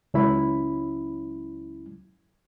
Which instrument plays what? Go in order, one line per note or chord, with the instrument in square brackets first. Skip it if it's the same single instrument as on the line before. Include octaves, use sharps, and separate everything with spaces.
[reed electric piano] C#2 F#3 C#4 E4 B5